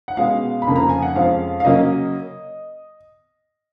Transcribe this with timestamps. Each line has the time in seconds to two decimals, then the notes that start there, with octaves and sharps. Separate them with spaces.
0.08 F#5
0.17 B2 G#3 C#4 F5
0.62 B5
0.67 F2 C#3 F3 A#3
0.76 A#5
0.89 G#5
1.02 F#5
1.16 F2 F3 G#3 C#4 F5
1.60 F5
1.65 C#3 F#3 A#3 C#4 D#5